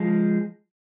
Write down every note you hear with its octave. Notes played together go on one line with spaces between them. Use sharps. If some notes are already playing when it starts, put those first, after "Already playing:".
Already playing: F3 G#3